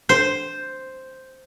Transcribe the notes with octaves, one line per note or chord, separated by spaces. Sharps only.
C5